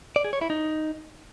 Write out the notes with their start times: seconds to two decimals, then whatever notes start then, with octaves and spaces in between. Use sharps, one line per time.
0.16 D5
0.24 G#4
0.33 C#5
0.41 E4
0.50 D#4